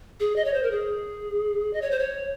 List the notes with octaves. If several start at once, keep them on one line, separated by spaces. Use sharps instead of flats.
G#4
D#5
C#5
C5
A#4
G#4
D#5
C#5
C5
C#5